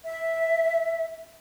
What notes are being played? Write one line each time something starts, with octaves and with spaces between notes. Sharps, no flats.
E5